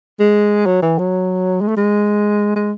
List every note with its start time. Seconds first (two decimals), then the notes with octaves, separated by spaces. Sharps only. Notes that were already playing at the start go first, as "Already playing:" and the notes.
0.20 G#3
0.66 F#3
0.82 E3
0.98 F#3
1.61 G#3
1.68 A3
1.77 G#3
2.56 G#3